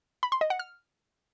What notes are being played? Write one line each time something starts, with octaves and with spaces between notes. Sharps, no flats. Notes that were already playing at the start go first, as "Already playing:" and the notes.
B5
C6
D#5
F#5
F6